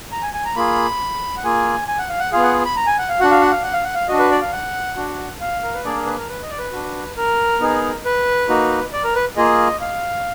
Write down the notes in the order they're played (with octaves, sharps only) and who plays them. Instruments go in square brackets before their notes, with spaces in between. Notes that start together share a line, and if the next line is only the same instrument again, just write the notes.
[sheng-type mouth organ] A#5
G#5
G#5
A#5
A#3 F4 G#4 B5
F#5
A#3 F4 G#4 G#5
G#5
F#5
F5
F#5
B3 F4 G#4 F5
F#5
B5
A#5
G#5
F#5
F5
D4 F#4 F#5
F5
F#5
F5
F#5
F5
F#5
F5
D4 F#4 D#5
B4
D5
F5
F#5
D4 F#4
F5
A#4
B4
A#3 D4 G#4 D5
A#4
B4
A#4
B4
D#5
D5
B4
D4 F#4
A#4
B3 D#4 G#4
B4
A#3 D#4 F#4
D5
A#4
B4
A#3 F4 G#4 D#5
F5